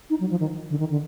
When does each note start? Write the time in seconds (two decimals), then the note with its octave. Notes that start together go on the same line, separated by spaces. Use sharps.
0.10 D#4
0.20 F#3
0.30 F3
0.40 D#3
0.70 D3
0.80 D#3
0.90 D3